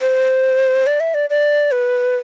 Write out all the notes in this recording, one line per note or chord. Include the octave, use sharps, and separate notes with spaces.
C5
D5
E5
D5
D5
B4